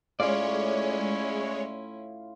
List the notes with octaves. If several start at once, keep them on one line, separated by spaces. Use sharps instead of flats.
A2 G#3 C#4 E4 F4 C#5 D5 F5